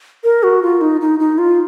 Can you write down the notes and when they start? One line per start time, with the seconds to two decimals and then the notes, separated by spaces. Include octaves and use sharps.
0.24 A#4
0.43 F#4
0.62 F4
0.81 D#4
1.01 D#4
1.20 D#4
1.38 F4